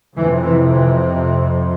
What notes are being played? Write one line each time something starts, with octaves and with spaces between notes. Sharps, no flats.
F2 C3 E3
E3
E3